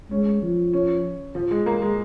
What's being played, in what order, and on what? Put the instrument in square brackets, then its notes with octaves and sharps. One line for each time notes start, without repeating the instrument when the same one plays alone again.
[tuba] G#3 [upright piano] C#4
[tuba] F3
[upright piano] C#4
F3
G#3
A#3
G#3